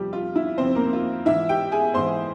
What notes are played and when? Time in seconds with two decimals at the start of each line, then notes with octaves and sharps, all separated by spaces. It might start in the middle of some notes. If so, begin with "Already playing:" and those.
Already playing: F2 C3 F3 G3 G4
0.13 F4
0.36 E4
0.58 F2 C3 F3 C4 C5
0.75 A#3 A#4
0.93 F4
1.26 G#2 E3 E4 E5
1.49 G4 G5
1.72 G#4 G#5
1.94 G#2 E3 C5 C6